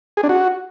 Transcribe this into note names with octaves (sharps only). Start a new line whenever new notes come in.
G#4
D4
F#4